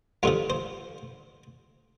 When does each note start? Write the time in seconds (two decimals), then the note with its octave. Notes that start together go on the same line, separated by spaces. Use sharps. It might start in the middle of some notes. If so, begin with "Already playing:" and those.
0.23 G2 D3 F3 F4
0.50 C5